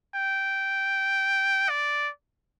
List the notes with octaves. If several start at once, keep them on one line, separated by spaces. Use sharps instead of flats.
G5
D5